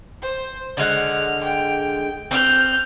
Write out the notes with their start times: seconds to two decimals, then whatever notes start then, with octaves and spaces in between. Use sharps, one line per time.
0.21 C5
0.77 D3 G#3 F#5 F6
1.43 G5
2.31 C4 F6 G6